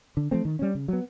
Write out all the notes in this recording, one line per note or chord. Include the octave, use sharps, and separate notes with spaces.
D3
F3 A3 C4
D#3
G3 A#3 C#4
C#3
F#3 B3